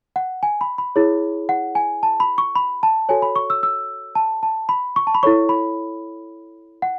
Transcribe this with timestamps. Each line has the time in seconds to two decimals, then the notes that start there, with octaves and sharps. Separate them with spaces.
0.16 F#5
0.43 G#5
0.61 B5
0.78 B5
0.96 E4 G#4 C#5
1.49 F#5
1.75 G#5
2.03 A5
2.20 B5
2.38 C#6
2.55 B5
2.83 A5
3.09 F#4 A4 C#5 G#5
3.22 B5
3.36 C#6
3.50 E6
3.63 E6
4.15 A5
4.43 A5
4.69 B5
4.96 C#6
5.07 A5
5.15 B5
5.23 E4 A4 C#5 C#6
5.49 B5
6.82 F#5